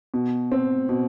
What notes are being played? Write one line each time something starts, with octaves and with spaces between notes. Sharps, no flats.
B2
C4
B2